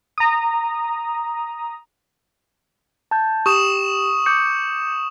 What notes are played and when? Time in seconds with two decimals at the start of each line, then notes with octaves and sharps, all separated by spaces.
0.18 A#5 D#6
3.11 A5 G6
3.46 G4 C#6 D#6 E7
4.26 D6 G6 C#7